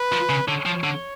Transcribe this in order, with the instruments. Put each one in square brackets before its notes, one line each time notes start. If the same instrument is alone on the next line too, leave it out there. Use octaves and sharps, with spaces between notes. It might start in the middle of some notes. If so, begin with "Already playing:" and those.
Already playing: [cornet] B4
[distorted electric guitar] F3
C#3
[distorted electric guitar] D3 [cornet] C#5
[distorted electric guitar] F3
D3